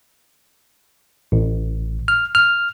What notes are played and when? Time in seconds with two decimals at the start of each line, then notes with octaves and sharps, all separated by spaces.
1.32 A1
2.08 F6
2.35 F6